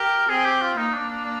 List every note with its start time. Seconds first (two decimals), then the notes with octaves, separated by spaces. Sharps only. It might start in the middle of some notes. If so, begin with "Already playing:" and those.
Already playing: G4 A#4
0.29 C4 G#4
0.45 G4
0.61 F4
0.77 A#3 D#4
0.94 D4
1.09 D4
1.25 D4